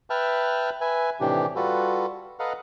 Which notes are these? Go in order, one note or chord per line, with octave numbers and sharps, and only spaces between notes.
B4 E5 G5 A5 F6 F#6
B4 E5 G#5
A2 C3 D#3 E3 D4 G4
G3 F4 F#4 A4 B4
A4 B4 D#5 F5 F#5 A#5